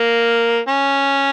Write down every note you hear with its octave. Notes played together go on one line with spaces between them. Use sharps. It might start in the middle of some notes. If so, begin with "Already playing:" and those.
Already playing: A#3
C#4